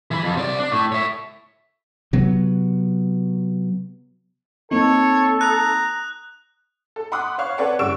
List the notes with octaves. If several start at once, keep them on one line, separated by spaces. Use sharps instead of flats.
E3 B5
F2
C3 D5
D4
A2 A3
C#5 E5
C3 F#3 B3
A#3 C4 D#4 A4 C#5
A#5 D#6 F#6
A4
F#5 B5 C6 D6 D#6 F#6
C5 C#5 F5 C#6
C4 A4 B4 C#5 D5 F#5
F#1 G3 C#6 E6 D7 E7